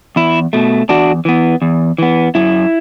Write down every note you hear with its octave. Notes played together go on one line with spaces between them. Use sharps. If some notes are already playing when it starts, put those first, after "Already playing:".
E2 E4
B2 A3
E2 D4 F#4
E3 B3
E2
E3 B3
F#2 E4